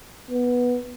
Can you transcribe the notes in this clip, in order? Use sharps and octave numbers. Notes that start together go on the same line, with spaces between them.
B3